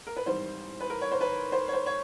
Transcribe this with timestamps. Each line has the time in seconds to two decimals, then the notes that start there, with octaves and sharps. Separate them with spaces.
0.07 A#4
0.17 B4
0.26 A1 G#2 D#3 G3 C4 C5
0.80 B4
0.90 A#4
1.01 C#5
1.12 C5
1.21 B4
1.52 C5
1.68 C#5
1.73 C5
1.86 C#5